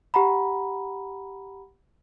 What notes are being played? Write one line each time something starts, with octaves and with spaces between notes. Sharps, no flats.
G4 F#5 A#5 B5